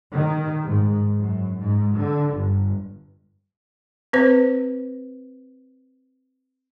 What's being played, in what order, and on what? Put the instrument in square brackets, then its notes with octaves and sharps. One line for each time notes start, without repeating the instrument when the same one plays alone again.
[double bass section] D#3
G#2
F#2
G#2
D3
G1
[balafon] C4 B4 C5